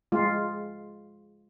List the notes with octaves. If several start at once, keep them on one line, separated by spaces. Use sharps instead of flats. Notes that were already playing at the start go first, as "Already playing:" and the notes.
G#3 F4